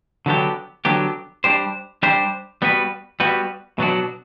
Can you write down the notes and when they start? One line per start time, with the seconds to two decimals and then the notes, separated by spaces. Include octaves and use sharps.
0.26 D3 F#3 B3 D4 G4
0.85 D3 F#3 B3 D4 G4
1.44 G3 D4 G4 C5
2.03 G3 D4 G4 C5
2.62 G3 B3 F#4 B4
3.20 G3 B3 F#4 B4
3.79 B2 F#3 B3 D4 F#4